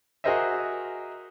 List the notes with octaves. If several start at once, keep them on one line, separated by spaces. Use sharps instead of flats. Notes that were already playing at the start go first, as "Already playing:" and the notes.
F#4 G#4 A#4 C5 D#5 E5